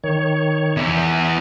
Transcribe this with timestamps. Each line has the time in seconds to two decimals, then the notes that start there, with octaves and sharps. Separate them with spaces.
0.04 D#3 C#5
0.77 E2 E5